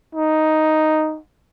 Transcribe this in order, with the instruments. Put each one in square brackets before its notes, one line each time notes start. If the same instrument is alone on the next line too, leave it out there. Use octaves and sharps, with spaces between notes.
[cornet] D#4